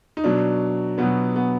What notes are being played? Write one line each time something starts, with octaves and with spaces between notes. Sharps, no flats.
D#4
B2 F#3 D4
B2 F#3 B3
B3